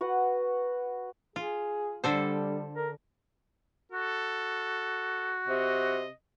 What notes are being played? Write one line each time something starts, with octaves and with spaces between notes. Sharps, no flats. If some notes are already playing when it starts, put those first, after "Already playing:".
F#4 B4 F#5
F4 G#4
D3 G3 A4 C5
A#4
F#4 A4
C3 D#5